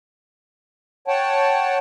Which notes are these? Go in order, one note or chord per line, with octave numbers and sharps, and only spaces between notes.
C#5 F#5 G5 A5